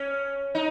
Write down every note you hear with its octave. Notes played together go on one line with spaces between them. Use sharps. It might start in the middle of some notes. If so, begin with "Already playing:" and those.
Already playing: C#4
D#4